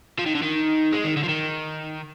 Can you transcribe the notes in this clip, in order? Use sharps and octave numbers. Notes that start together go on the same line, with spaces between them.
F3
D#3
D3
D#3
G#3
D#3
D3
F3
D#3